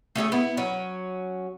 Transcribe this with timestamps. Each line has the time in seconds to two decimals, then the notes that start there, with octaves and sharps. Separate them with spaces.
0.16 A3 C#4 F#4 G#4
0.32 B3 E4
0.57 F#3 C#4